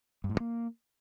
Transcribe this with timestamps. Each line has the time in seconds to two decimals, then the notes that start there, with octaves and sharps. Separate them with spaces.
0.24 G2
0.29 A2
0.35 G2
0.40 A#3